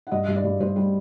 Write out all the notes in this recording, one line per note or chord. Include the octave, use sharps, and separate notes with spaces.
F#5
G2 D#5
G2
D5
G2
G2 C5
G3